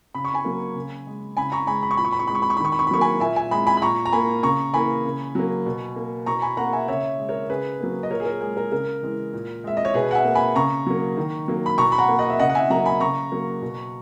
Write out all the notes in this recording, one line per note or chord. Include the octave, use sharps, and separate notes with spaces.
C#3 B5
C#6
G#5 B5
F#3 A#3
C#3
G#3
C#3 G#5 B5
A#5 C#6
G#3 G#5 B5
B5
C#6
A#2 B5
C#6
B5
C#6
G#3 B5
C#6
B5
C#6
D#3 B5
C#6
B5
C#6
B5
F#3 A#3 C#6
G#5 B5
A#2 E5 G#5
E5 G#5
G#3 G#5 B5
G#5 B5
B5
A#2 A#5 C#6
A#5
A#3 G#5 B5
C#3 A#5 C#6
E3 A#3 G#5 B5
C#3
F#3 A#3
B2
A#3
B2 A#5 C#6
G#5 B5
A#3 F#5 A#5
E5 G#5
C#3 C#5 E5
G#3
A#4 C#5
C#3 G#4 B4
F#3 A#3
D#5
A#2 A#4 C#5
G#4
A#4
G#3 G#4
A#4
C#3 A#4
E3 G#3
A#2
G#3 E5
D#5
C#5
B2 G#4 B4
F#5
E5 G#5
A#3
G#5 B5
C#3 A#5 C#6
F#3 A#3
D#3
F#3 A#3
B5
B2 A#5 C#6
B5
F#5 A#5
A#3
D#5 F#5
E5
C#3 D#5 F#5
F#5
E5 G#5
F#3 A#3 F#5 A#5
G#5 B5
C#3 A#5 C#6
F#3 A#3
B2